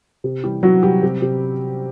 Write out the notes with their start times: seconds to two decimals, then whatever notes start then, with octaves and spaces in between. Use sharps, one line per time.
0.24 C3
0.44 E3 G3 G4
0.63 E3 F#3 F#4
0.83 C3 G3 G4
1.03 C3
1.22 C3